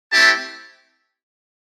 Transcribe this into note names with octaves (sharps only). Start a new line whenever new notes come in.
A3 C4 E4 G4 A5